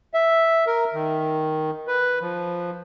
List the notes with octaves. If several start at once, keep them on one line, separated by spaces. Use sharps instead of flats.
E5
A#4
D#3
B4
F3